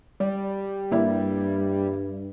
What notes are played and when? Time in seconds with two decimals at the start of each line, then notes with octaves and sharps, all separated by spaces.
0.20 G3 D5
0.91 G2 A#3 E4 D5